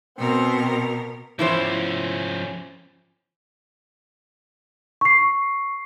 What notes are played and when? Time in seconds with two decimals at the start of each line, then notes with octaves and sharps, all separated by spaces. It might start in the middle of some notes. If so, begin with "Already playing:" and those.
0.19 B2 C4 A#4
1.39 E3 F3 C#4 E4 C5
5.01 C#6 C7